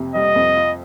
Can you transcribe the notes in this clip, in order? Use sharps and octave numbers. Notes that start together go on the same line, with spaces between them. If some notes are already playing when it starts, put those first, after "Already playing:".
Already playing: F2 C3
G3 D#5
F2
F4